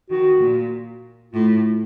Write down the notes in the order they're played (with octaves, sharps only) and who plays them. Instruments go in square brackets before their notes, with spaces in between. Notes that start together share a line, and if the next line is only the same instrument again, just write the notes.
[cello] D#3 [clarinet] F#4
[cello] A#2
[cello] A2 [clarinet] F4